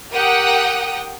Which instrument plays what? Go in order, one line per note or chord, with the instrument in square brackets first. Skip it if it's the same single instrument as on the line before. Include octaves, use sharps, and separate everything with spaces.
[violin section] G4 A#4 F#5 G5 D#6